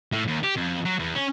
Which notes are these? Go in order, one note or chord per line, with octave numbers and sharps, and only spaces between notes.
A2
D#2
G4
F2
F#3
E2
C#4